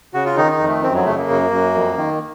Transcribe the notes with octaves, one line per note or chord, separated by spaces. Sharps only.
C#3 F#4
F4
D#3 D#4
D#4
F2
A3
F#2 C4
F#3
C#3 A3
A#3
F#2
F#2
F2
D#3